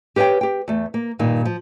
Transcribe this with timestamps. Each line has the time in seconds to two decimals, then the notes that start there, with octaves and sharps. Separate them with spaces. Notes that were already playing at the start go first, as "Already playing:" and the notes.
0.16 G4 B4 C#5 E5 G5
0.41 G4 G5
0.68 E2 A3
0.94 A#3
1.19 G2 A#2 D#3 G3
1.45 F3